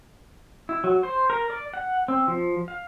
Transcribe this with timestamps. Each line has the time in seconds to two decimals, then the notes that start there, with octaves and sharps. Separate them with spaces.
0.69 E4
0.84 F#3
1.03 C5
1.30 A#4
1.50 D5
1.74 F#5
2.08 C4
2.28 F3
2.68 F5